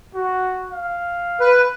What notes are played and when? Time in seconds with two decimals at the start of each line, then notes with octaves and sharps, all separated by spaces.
0.15 F#4
0.71 F5
1.40 B4